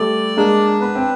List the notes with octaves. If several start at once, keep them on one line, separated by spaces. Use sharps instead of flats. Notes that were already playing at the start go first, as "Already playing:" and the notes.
Already playing: G3 A3 D5
G#3 A#3 D4
B3 B4
C4